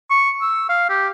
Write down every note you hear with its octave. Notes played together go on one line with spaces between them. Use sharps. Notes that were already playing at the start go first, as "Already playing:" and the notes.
C#6
E6
F5
G4